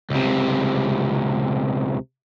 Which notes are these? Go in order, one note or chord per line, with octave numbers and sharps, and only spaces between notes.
C#2 C3